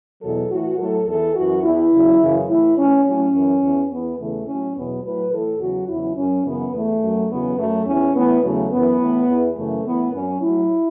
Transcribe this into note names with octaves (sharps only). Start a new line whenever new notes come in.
E2 B2 F#3 A4
A2 E3 F#4
A2 F#3 A4
E2 E3 A4
F#2 E3 F#4
E2 E3 E4
E2 C#3 F#3
F#2 C#3 E3
A2 E3 E4
A2 E3 C#4
A2 F#3 C#4
F#2 E3
E2 E3
E2 E3 B3
E2 C#3 E3 A3
A2 F#3 C#4
E2 B2 F#3 B3
A2 F#3 B4
A2 E3 A4
E2 C#3 F#3 F#4
E2 C#3 F#3 E4
F#2 F#3 C#4
F#2 C#3 E3 B3
E2 E3 A3
F#2 F#3
E2 C#3 F#3 B3
F#2 F#3 A3
E2 E3 C#4
A2 E3 B3
E2 C#3 F#3 A3
F#2 E3 B3
A2 E3
E2 E3
F#2 C#3 E3 A3
A2 E3 B3
F#2 F#3 C#4
A2 F#3 E4